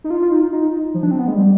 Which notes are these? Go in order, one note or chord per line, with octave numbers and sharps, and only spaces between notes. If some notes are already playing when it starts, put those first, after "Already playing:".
D#4
F4
F4
D#4
F4
D#4
F3
D4
C4
B3
G#3
G3